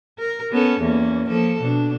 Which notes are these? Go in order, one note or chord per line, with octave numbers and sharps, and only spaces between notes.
A#4
B3 C#4 A4
E2 A#3 C#4
F3 A#3 A4
B2 D4